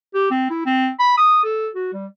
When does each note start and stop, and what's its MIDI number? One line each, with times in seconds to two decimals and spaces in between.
0.14 0.27 67
0.30 0.47 60
0.50 0.62 64
0.66 0.89 60
0.99 1.15 83
1.17 1.43 87
1.44 1.68 69
1.75 1.88 66
1.93 2.06 55